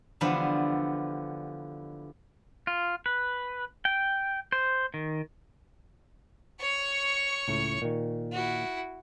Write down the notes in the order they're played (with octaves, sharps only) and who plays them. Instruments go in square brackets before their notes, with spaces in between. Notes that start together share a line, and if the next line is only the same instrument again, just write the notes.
[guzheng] D3 E3 F3 G3 B3
[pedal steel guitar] F4
B4
G5
C5
D#3
[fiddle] C#5 C#6
[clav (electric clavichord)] C#2 A2
A#2 D#3
[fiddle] E4 F#4